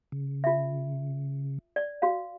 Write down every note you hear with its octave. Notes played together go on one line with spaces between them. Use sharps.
C#3
F4 E5
D5
F#4 F5